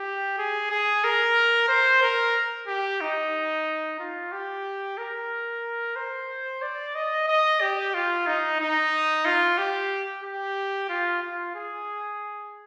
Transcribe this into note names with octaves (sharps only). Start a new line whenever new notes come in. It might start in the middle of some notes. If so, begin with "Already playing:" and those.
Already playing: G4
G#4
G#4
A#4
C5
A#4
G4
D#4
F4
G4
A#4
C5
D5
D#5
D#5
G4
F4
D#4
D#4
F4
G4
G4
F4
F4
G#4